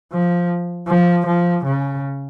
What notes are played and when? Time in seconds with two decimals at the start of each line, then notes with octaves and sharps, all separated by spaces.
0.12 F3
0.88 F3
1.27 F3
1.65 C#3